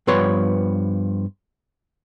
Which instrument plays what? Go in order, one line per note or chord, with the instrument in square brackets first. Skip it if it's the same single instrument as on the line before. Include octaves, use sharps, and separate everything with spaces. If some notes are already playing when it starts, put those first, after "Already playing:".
[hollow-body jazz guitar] G2 F3 B3 B4 C#5 C6